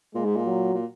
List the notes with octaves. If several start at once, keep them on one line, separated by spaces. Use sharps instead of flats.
A#2 G#3
G#2
A#2
F#3
A#2